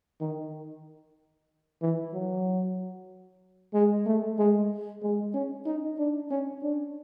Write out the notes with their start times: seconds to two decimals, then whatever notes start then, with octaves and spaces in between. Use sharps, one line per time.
0.21 D#3
1.82 E3
2.14 F#3
3.74 G#3
4.06 A3
4.38 G#3
5.02 G#3
5.34 C#4
5.66 D#4
5.98 D4
6.31 C#4
6.63 D4